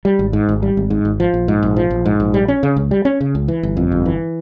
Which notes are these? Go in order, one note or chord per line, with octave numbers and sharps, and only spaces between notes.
G3
G#1
G#2
G#1
G3
G#1
G#2
G#1
F3
A#1
G#2
A#1
F3
A#1
G#2
A#1
G3
C#4
C#3
C#2
G3
C#4
C#3
C#2
E3
G1
F2
G1
E3